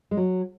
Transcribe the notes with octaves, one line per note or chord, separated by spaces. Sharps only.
G#3
F#3